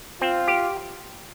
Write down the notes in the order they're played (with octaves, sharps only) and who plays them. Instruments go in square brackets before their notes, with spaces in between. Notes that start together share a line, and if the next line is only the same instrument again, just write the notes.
[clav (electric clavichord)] C4 [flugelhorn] F4
[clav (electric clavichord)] G4